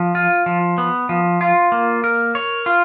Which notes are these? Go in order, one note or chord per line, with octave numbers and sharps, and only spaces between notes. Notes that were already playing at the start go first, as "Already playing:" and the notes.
Already playing: F3
F4
F3
B3
F3
F4
A#3
A#4
C#5
F4